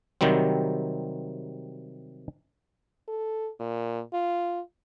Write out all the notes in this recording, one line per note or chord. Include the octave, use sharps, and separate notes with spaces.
C3 D#3 F#3 G3 C4
A4
A#2
F4